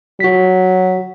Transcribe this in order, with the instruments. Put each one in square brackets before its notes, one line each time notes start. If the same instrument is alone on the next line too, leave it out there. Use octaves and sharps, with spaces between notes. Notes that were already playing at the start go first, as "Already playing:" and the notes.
[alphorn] F#3 [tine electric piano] F#4 B6